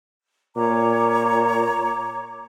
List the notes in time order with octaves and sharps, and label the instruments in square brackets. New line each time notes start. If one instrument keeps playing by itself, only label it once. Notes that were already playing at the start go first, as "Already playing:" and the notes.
[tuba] A#2 [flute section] C#5 A#5 D6